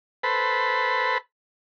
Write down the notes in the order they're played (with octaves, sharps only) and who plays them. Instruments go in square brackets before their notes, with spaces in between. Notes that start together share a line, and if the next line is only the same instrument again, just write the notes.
[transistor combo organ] A4 B4 C5 B5